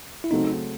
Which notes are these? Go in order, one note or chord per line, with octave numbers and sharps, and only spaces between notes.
E4
C#3 F#3 A3 C4 D#4